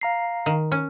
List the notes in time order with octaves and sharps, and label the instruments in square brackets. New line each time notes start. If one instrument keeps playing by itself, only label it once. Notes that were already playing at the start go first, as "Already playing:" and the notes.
[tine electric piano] F5 A#5 C7
[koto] D#3
C#4